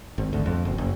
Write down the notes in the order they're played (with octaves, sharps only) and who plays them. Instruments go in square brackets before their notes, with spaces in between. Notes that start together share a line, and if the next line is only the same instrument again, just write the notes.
[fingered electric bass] G#1
D2
F2
F#1
F#1